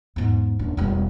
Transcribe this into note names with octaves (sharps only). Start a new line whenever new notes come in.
E2 G#2
D#1 D4
E1 G3